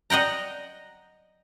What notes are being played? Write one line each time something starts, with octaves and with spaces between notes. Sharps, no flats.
D#5 F#5 G5 A#5